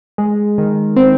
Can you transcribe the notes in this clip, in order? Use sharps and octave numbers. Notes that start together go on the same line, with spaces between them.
G#3
D#3
C4